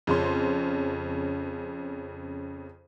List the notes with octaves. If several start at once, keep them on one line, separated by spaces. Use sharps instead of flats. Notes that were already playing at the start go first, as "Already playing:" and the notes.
F2 C#3 C#4 C6